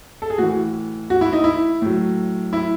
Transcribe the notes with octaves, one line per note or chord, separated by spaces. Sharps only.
A4
G#4
A2 E3 F#4
F#4
E4
D#4
E4
A2 F#3
E4